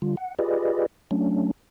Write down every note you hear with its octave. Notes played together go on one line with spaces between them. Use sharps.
D3 G3 F4
F#5
F4 G4 G#4 B4 D5 D#5
F#3 A3 C#4 D4